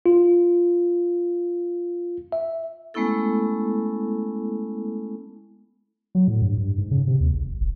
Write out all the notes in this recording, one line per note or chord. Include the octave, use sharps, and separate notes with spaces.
F4
E5
G#3 A3 B3 C#4 E4 A4
F#3
A2
G2
G2
G#2
C#3
C3
D#2
G#1
G#1
D1